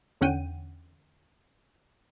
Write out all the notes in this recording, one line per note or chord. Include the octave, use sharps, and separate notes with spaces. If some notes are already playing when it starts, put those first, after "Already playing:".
E2 D3 C#4 F#5 G5 D#7